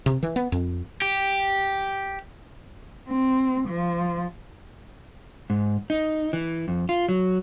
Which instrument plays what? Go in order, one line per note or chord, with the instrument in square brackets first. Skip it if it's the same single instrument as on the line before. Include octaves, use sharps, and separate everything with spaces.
[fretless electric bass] C3
E3
B3
F2
[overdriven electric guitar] G4
[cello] C4
F3
[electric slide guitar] G#2
D#4
E3
F2
F4
F#3